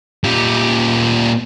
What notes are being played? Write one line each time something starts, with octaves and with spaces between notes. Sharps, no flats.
A#2 G4